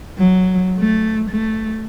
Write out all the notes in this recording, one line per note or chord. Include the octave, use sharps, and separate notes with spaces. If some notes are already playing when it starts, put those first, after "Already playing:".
F#3
A3
A3